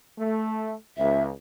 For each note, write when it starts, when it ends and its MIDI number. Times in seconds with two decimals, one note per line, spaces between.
0.18 0.74 57
0.98 1.30 37
0.98 1.22 76